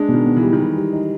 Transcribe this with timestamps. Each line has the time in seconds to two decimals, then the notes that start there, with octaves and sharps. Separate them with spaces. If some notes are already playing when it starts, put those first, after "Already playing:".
Already playing: G#3 D4
0.09 B2
0.14 D#3
0.25 B3
0.36 E3
0.43 G3
0.53 D#3
0.59 E3 G4
0.76 G3
0.93 D#4